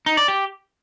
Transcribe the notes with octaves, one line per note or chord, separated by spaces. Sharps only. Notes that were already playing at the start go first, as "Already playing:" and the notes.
D#4
D5
G4